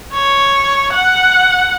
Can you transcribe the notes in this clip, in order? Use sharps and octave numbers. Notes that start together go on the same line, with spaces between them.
C#5
F#5